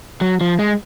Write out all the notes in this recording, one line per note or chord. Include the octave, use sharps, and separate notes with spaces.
F#3
F3
G#3